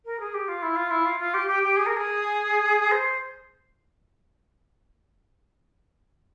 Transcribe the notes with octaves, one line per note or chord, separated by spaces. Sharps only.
A#4
G#4
G4
F4
E4
F4
E4
F4
F4
G4
G4
G4
G#4
A#4
G#4
C5